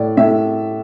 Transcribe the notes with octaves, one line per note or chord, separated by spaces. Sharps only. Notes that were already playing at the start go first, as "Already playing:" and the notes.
Already playing: A2 D5
A2 E5